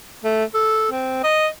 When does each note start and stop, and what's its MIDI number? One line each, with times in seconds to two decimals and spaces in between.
0.24 0.44 57
0.54 0.86 69
0.91 1.23 60
1.24 1.48 75